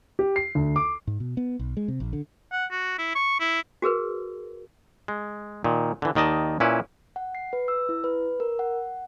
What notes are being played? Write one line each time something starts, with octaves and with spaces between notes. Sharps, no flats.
G4
C7
D2
D6
G#2
B2
B3
B1
G#3
C3
A#1
D3
F#5
F#4
E4
C#6
E4
F#4 G#4 A#4 B4
G#3
A#2 D#3
D3 E3
D#2 D#3 D5 D#5 A5
A#2 C#4 E4 B4
F#5
C7
B4
E6
E4
B4
A#4
F#5